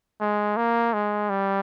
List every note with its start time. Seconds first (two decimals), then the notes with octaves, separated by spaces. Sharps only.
0.21 G#3
0.57 A#3
0.93 G#3
1.30 G3